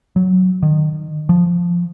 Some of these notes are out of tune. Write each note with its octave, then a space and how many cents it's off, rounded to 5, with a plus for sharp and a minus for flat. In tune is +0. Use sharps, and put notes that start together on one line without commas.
F#3 +0
D#3 -30
F3 +0